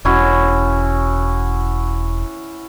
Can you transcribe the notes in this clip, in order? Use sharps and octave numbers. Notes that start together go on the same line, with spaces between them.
E1 C#4 E4 F#4